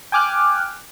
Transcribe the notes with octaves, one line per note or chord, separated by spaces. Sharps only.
G5 G#5 D6 F6 F#6